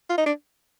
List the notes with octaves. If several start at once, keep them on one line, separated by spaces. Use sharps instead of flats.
F4
D#4
D4